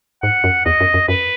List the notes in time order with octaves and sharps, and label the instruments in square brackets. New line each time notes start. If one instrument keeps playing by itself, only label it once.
[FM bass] G#2 [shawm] F#5
[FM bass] F#2
[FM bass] E2 [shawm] D#5
[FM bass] F#2
F#2
[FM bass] F#2 [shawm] B4